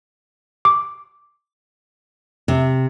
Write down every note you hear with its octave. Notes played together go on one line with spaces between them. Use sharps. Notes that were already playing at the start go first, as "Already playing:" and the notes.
D6
C3